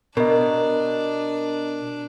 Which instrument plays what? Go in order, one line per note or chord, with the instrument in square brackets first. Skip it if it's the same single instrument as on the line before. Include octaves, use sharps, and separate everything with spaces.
[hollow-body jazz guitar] B2 [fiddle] D4 [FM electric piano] A#4 [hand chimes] D#5 A#5